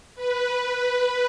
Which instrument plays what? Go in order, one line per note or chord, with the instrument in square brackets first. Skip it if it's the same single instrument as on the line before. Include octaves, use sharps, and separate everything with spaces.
[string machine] B4